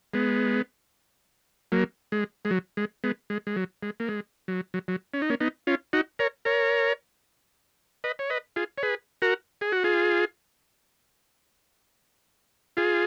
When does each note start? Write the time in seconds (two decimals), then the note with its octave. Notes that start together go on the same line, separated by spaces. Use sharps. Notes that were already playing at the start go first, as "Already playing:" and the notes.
0.14 G#3 B3
1.72 F#3 A#3
2.12 G#3
2.45 G#3
2.51 F#3
2.77 G#3
3.04 G#3 B3
3.30 G#3
3.47 G#3
3.56 F#3
3.83 G#3
4.00 A#3
4.08 G#3
4.48 F#3
4.74 F#3
4.88 F#3
5.14 C#4
5.22 D#4
5.30 A#3 C#4
5.40 B3 D#4
5.67 C#4 F4
5.93 D#4 F#4
6.19 A#4 C#5
6.45 A#4 C#5
8.04 B4 D#5
8.19 C#5
8.30 B4 D#5
8.56 F4 G#4
8.78 C#5
8.83 G#4 B4
9.22 F#4 A#4
9.61 G#4
9.72 F#4
9.84 F4 G#4
12.77 F4 G#4